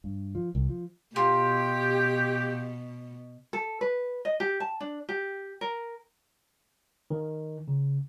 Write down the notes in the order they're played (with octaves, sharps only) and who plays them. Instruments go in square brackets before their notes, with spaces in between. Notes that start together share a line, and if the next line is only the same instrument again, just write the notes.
[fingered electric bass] G2
F3
C2
F3
[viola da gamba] B2 [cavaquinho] F4 [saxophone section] G4
[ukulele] A4
B4
D#5
G4
A5
D4
G4
A#4
[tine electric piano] D#3
C#3